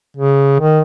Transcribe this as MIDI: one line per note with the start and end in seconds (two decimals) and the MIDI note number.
0.17 0.57 49
0.59 0.81 51